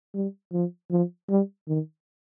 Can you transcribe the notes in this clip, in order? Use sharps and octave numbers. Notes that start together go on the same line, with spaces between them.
G3
F3
F3
G3
D#3